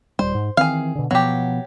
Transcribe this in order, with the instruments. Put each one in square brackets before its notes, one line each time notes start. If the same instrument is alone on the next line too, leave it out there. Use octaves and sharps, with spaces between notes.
[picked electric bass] D#1 G3 [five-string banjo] C5
[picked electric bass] G#2
[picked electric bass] D#3 E3 C4 [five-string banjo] G#4 F5
[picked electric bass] B2 D3
[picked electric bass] B2 F3 B3 [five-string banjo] F#3 G4